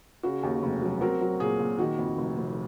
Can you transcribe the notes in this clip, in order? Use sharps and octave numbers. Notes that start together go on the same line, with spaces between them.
C#3 F#4
D#2
F1
F#3
C4 F#4 A#4
F#3
A#2 G#4
A#2
D#3 F#4
F2
F1
F1